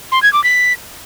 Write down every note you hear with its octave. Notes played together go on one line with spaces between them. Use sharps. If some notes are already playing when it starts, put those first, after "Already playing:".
C6
G#6
D6
B6